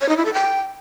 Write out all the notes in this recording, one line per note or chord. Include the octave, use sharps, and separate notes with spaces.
C#5
D#4
E4
A4
G5